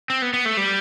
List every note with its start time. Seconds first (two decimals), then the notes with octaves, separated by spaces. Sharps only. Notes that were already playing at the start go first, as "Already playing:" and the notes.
0.10 C4
0.22 B3
0.34 B3
0.45 A3
0.57 G3